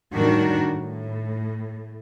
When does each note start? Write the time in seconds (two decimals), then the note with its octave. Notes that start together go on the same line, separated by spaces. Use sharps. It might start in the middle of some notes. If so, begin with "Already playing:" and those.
0.14 A2 D#3 G3 D4 F#4 A#4
0.71 A2